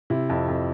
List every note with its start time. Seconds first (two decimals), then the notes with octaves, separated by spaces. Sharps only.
0.10 C3 E4
0.30 F2
0.48 F2